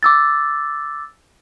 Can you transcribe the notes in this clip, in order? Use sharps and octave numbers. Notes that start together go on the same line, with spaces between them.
D6 E6 A6